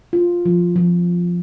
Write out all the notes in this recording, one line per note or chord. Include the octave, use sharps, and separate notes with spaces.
F4
F3
F3